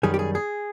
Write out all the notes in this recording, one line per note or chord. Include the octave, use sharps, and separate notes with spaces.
F#2 D#3 G3 G#4
G4
G#4
G#4